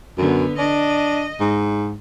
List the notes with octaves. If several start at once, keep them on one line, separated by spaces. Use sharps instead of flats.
F#2 D3 B3
D4 D#5
G#2